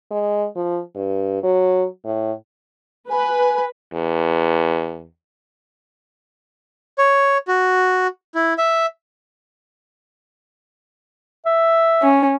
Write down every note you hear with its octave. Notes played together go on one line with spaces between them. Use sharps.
G#3
F3
G2
F#3
A2
B4 G#5
E2
C#5
F#4
E4
E5
E5
C#4